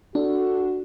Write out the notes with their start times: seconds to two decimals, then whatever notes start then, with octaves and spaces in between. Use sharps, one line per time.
0.15 D4 F#4 A4